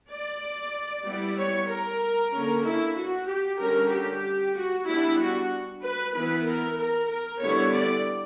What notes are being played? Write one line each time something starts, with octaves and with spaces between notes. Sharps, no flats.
D5
G3 B3 E4
C#5
A#4
D3 A#3 C#4
E4
F#4
G4
D3 G3 C#4 A#4
G4
F#4
G3 B3 D4 E4
F#4
B4
E3 B3 E4 B4
A#4
A#4
A#4
D3 G3 B3 E4 C#5
D5